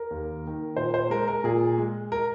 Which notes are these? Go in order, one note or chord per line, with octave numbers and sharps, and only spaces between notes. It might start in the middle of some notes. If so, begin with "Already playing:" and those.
Already playing: A#4
D#2
D#3 A#3
A#2 C5
C5
G#3 A#4
A#4
A#2 G#4
G#3
A#4